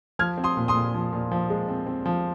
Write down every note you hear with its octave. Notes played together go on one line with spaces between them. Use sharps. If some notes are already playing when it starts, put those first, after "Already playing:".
F3 F6 G#6
C4
C6 D#6
A#2
C6 D#6
A#2
F3
A#2
F3
G#3
C4
C4
F3